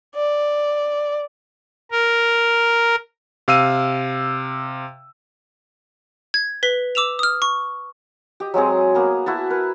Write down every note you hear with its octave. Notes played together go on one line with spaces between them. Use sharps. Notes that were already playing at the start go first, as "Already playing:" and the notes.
D5
A#4
C3 F5 E6 D#7
G#6
B4 B6 G7
D6 E6 E7 F7
D#6 F6
C#6
G4 D#5
F#3 G#3 C4 G#4
A#3 B3 G#4
E4 F#4 A5
A#4 B4